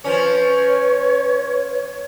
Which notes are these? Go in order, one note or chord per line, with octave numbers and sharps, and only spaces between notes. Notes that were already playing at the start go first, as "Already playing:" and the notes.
F3 C#4 B4 C#5